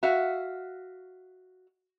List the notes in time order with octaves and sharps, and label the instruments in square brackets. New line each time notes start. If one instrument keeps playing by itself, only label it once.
[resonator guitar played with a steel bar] F#4 E5 F5